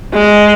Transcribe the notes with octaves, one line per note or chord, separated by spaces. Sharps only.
G#3